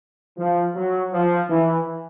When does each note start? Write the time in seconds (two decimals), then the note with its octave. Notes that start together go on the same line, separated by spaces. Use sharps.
0.38 F3
0.75 F#3
1.13 F3
1.49 E3